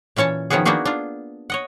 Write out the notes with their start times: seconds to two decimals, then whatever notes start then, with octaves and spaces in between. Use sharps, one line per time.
0.16 A#2 E3 C#4 C#5 A5
0.50 D#3 F3 B3 C#4 F#4 G#4
0.65 A#3 B3 D4 D#4 F#4 G#4
0.85 D4 F4
1.50 C#5 D#5 F#5